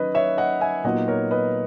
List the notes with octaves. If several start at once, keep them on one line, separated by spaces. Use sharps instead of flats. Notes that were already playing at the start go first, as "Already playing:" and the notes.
Already playing: D#3 F#3 C#4 B4 D#5
C#5 E5
D#5 F#5
E5 G#5
A#2 F#3 B3 D#4 D#5 F#5
A#4 C#5
B4 D#5